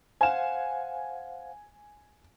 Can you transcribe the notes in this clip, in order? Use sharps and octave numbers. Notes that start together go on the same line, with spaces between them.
C5 F5 F#5 G#5 E7